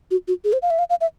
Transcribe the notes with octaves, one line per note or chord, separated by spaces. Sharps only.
F#4
F#4
G#4
C5
F5
E5
F5
F5
E5